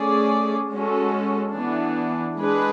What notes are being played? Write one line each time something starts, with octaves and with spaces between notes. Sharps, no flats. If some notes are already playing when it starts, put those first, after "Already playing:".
Already playing: A3 C#4 G#4 D5
G#3 C#4 F#4 A4
E3 B3 D4
G#3 D4 G#4 B4